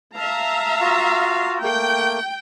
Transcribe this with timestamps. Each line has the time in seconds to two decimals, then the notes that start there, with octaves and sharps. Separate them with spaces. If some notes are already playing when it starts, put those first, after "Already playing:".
0.16 E5 F5 A5 A#5
0.80 F4 F#4
1.62 A3 A#3 G5